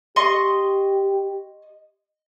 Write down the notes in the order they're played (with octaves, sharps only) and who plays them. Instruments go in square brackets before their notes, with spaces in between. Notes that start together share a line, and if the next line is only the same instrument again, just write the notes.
[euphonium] G4 [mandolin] D#5 C6 C#6